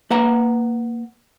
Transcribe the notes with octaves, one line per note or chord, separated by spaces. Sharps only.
A#3 B4 F#5 A#5